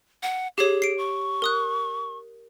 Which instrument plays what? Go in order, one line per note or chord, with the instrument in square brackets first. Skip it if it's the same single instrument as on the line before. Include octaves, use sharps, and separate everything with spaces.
[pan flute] F#5
[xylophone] G4 C#5 [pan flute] G#4
[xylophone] C7 D7
[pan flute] C#6
[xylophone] A#4 D#6 F#6